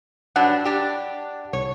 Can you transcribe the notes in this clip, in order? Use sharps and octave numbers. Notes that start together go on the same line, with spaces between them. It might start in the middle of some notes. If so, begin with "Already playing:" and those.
G2 F#3 D4 F#5
D4 G4
C2 C#5